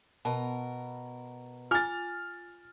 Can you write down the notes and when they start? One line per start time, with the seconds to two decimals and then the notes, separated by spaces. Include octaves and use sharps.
0.25 B2 A#4 A5
1.71 F4 G#5 D6 F6 A6